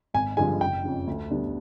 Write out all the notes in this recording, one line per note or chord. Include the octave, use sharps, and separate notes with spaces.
G#1 G#5
G2 D3 F3 G#3 G#5
F#1 G5
F2 C#3 F3
D2
D3 G3 B3 D4